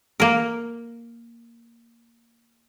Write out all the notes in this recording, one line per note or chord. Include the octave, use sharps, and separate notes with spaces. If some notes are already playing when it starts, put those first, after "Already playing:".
A#3 A#4